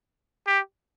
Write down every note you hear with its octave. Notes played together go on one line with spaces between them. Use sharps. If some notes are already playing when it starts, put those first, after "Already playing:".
G4